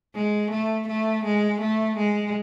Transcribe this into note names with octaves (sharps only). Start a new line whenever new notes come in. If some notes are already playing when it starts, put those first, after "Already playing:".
G#3
A3
A3
G#3
A3
G#3